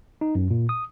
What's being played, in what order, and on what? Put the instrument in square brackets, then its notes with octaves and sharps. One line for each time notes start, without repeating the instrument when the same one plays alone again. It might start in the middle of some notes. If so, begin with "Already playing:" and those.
[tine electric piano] D#4
F#2
A#2
D#6